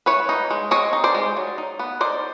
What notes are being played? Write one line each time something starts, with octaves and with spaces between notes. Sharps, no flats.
E3 B4 C#5
D#4
G#3
C4 C#5 D#5
D#4
C5 D5
G#3
F#3
D#4
B3
D#4 C5 D5